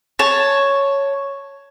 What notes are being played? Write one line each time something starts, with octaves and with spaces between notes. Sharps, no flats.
C#5 A5